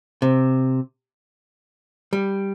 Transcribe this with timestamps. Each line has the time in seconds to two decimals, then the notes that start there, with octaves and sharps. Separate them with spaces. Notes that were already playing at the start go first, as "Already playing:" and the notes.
0.22 C3
2.13 G3